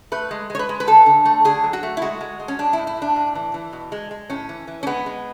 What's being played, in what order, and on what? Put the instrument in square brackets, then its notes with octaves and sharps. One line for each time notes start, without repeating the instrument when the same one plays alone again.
[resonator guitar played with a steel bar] A3 B4
G#3
G#3 C#5
B4
G#3
B4
D3 A4
D3
A3
D3 G#4
F#3
F#4
A3
E4
G#3 F#4
G#3
G#3
C#4
G#3 D4
A2 E4
E4
A2 D4
A2
E3
E3
B2
G#3
G#3
A2 C#4
E3
E3
C#4
G#3 B3
G#3